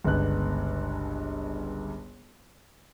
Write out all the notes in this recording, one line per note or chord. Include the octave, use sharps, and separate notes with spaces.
G1 C#2 G2 B3 F#6